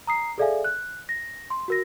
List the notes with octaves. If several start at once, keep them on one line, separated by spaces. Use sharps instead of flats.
A#5 D#6 C7
G#4 A4 D5 E5 F5 G#5
F#6
A#6
C6
F#4 A#4 A#6